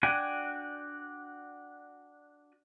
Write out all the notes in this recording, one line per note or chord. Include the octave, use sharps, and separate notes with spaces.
D4 F#4 G5 G#5